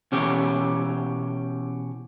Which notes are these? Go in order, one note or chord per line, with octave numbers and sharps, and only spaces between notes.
B2 E3 C#4 G4